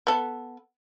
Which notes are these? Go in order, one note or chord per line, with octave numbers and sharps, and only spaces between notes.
B3 A4